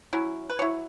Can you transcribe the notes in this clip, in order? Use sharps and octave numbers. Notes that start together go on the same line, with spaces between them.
F#3 C#4 E4
B4
F#3 E4 C#5